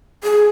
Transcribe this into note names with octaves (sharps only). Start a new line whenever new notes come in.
G#4